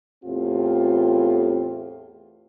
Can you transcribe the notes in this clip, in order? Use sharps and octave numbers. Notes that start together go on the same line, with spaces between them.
E2 A2 C4 F4 G4